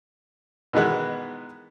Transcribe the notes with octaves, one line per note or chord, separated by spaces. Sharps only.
B2 D#3 E3 G#3 B3